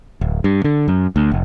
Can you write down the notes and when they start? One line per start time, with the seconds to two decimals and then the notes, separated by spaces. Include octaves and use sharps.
0.21 D1
0.44 G2
0.64 D3
0.88 F#2
1.16 D2
1.32 F1